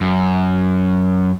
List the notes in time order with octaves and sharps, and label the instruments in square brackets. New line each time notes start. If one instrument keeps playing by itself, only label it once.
[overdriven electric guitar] F#2